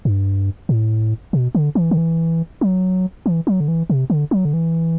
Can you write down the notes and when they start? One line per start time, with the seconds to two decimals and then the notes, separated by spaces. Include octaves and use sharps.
0.05 G2
0.69 A2
1.33 B2
1.55 D3
1.75 E3
1.91 D3
1.98 E3
2.61 F#3
3.26 E3
3.47 F#3
3.60 D3
3.68 E3
3.90 C3
4.10 D3
4.31 F#3
4.45 D3
4.53 E3